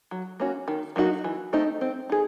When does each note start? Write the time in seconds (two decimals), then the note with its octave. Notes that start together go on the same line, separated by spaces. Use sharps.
0.11 F#3
0.40 A#3 C#4 F#4
0.68 D#3
0.96 F#3 A#3 D#4 F#4
1.24 E3
1.53 A3 C4 D#4
1.81 C4
2.10 D#4 G#4